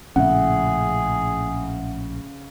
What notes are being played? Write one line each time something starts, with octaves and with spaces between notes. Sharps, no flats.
A#1 A2 C#3 G#4 E5 F#5